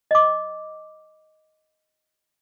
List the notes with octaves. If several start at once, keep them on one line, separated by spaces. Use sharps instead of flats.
D#5 D6